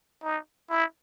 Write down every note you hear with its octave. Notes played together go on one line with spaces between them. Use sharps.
D#4
E4